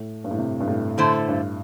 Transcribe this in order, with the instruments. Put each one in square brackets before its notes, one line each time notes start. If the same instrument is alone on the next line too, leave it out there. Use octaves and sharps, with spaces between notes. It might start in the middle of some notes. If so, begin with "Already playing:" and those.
Already playing: [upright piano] A2
G2
A2
C3
G2
A2
[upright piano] A2 [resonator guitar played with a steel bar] D3 A3 E4 C5
[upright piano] G2